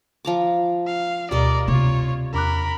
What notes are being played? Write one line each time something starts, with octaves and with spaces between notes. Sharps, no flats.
F3 A#5 D6
F5
D2 B2 G3 A#4 D5 D#5
C3 F4 C#5
E2 A#4 B5 D6 F#6